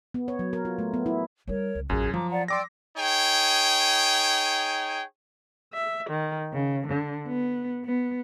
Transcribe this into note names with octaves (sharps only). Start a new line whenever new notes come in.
B3
C#5
F#3
A#4
F4
A3
B3
E4
G3 D#4 A#4 C#5
C#2
A1 F#2 F4 G#4 F#6
F3 F#3 A#5 D6
D5 F#5 A#5
D5 G5 C6 D6 E6 A#6
D#4 G#4 C#5 G5
E5
D#3
C#3
D3
B3
B3